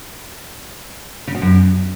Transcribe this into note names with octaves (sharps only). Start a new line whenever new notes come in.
C#3
B2
F#2